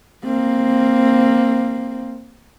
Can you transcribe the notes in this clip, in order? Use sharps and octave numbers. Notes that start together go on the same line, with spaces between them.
A#3 C4